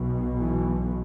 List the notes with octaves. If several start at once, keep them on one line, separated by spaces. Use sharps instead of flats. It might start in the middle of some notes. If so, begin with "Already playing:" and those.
Already playing: B1 B2
E3